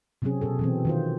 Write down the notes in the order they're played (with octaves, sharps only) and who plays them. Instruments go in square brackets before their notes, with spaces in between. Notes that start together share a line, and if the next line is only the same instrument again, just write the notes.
[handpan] C3 F#3 C4 C#4 G#4
B2 G#4 A4
B2 E3 C4
D#3 F4 C5